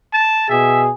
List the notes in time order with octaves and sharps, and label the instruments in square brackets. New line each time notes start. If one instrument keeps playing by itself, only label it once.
[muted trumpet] A5
[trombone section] B2 G#4 [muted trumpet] E5